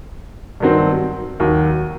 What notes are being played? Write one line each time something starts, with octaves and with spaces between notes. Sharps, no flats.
G2 D#3 F#3 C4
D#2 D#3 F#3